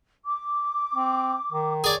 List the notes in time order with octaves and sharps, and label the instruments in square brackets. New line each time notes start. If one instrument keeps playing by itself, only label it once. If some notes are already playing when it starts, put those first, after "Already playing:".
[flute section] D6
[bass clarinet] C4
D#3
[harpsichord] G#4 D5 [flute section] C#5